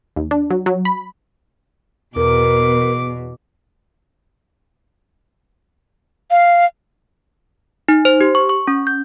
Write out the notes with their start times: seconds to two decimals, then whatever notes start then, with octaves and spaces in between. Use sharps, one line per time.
0.16 D#2
0.31 D4
0.50 F#3
0.66 F#3
0.85 B5
2.16 E2 B2 A#4 D6
6.31 F5
7.88 D#4
8.05 C5
8.21 G4
8.35 C#6
8.49 C#6
8.68 C#4
8.87 G6